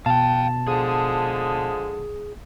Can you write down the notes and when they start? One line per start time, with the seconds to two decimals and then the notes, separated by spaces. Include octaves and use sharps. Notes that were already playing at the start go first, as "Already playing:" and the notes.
0.06 B2 F5 G5 A5
0.68 D3 F3 G#3 G#4